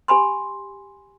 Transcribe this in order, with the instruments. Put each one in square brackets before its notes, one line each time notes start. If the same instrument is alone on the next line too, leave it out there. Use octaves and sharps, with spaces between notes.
[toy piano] G4 G#5 B5 C6